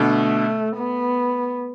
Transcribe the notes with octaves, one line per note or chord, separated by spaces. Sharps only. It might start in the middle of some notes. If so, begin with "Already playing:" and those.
Already playing: B2 D3 A3
B3